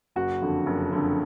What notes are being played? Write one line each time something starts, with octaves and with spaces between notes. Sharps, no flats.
F#1 F#4
F2 D3
F#1
F2 D3